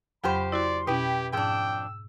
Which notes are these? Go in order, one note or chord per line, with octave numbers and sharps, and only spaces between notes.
F2 C#3 F#3 G4 C5 B5
E4 F#4 D5 C6
B2 C#4 E4 G4 B4 G5
F2 G#2 D4 G5 E6